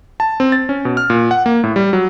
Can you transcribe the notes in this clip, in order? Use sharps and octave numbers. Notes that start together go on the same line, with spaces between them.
A5
C4
A6
C#4
B2
F6
A#2
F#5
A#3
A2
G3
F#3